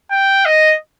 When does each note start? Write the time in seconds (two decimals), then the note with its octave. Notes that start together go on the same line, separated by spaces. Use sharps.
0.11 G5
0.45 D#5